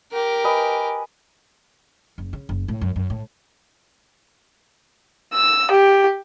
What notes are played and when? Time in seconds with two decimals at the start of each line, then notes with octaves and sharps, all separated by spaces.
0.12 G4 A#4
0.44 B4 D#5 G#5
2.18 F#1
2.33 C#3
2.49 F#1
2.68 A2
2.81 F#2
2.96 F#2
3.10 A2
5.34 E6
5.71 G4